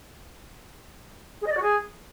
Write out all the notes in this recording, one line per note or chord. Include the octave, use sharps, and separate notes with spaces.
G#4
D#5
D5
F#4
G#4